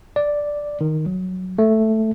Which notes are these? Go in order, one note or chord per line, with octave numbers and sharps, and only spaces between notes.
D5
D#3
F#3
A3